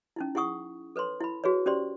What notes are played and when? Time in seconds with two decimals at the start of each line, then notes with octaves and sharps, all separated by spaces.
0.16 C#4 D#4 E4
0.35 E4 G#4 F#5 C#6 D#6
0.96 A4 B4 C#5 C6
1.21 E4 B5
1.44 F#4 G#4 B4 C#5
1.66 C#4 G4 C5 D5 C6